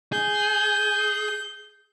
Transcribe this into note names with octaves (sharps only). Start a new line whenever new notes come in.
G#4 G6